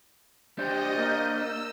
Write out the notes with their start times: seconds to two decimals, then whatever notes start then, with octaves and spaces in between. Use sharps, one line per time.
0.58 D4 G4 C5 D#5 G6
0.96 A#3
1.32 E6